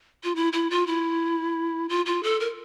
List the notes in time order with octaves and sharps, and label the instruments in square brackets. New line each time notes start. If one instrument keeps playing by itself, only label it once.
[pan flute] F4
E4
E4
F4
E4
F4
F4
A4
A#4